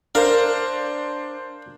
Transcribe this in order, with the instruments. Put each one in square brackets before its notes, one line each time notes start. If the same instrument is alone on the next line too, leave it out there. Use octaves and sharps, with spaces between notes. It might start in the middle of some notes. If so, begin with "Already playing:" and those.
[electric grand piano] D4 C5 [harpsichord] A#4 F5